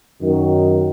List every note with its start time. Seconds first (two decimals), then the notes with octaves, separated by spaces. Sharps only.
0.22 F#2 D#3 F#3